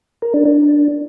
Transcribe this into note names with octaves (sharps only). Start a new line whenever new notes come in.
A#4
D4
D4